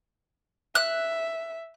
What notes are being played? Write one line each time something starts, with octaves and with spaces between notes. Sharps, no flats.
E5 F#6